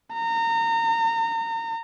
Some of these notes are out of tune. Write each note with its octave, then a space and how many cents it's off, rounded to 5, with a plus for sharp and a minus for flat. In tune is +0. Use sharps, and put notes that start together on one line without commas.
A#5 -30